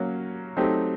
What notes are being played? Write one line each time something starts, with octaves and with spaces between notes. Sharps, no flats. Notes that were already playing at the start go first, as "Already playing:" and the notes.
Already playing: F#3 A#3 C#4
F#3 A3 C4 D#4 G4